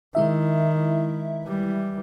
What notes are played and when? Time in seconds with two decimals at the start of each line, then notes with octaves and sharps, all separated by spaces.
0.15 D#3 G#3 E4 E5
1.45 E3 G3